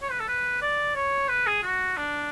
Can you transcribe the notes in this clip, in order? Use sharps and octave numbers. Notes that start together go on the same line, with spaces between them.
C#5
B4
A4
B4
D5
C#5
B4
G#4
F#4
D4